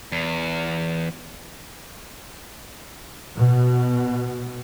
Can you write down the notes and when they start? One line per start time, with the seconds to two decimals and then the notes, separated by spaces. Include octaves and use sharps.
0.12 E2
3.36 B2